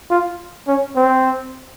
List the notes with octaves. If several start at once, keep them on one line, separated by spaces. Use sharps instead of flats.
F4
C#4
C4